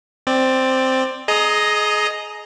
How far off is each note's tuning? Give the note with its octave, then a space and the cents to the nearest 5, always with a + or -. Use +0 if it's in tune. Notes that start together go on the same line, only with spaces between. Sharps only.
C4 +0 D5 +15
G#4 +25 D#5 +0 A#5 +0